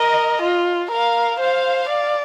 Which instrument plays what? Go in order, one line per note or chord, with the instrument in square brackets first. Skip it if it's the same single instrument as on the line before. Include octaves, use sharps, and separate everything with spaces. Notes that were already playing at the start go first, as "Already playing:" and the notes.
Already playing: [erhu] A#4 [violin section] D#5
[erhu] F4
[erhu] A#4 [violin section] F5
[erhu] C5 [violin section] F5
[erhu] D5